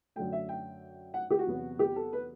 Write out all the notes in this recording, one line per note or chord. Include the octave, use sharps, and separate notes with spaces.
F#2 D3 F#3 A3 G5
E5
G5
F#5
G4
F#4
E2 C3 F#3 B3
G4
A4
B4